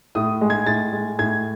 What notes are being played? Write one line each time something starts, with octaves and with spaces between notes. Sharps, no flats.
A2 D#6
G#3
G#6
A2 A6
G#3
A2 G#6